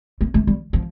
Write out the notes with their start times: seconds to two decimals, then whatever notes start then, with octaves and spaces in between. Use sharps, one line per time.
0.21 A3
0.34 A3
0.47 G3
0.73 F3